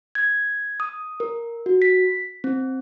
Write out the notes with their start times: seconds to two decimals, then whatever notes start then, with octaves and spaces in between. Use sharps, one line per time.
0.15 G#6
0.80 D#6
1.20 A#4
1.66 F#4
1.82 B6
2.44 C4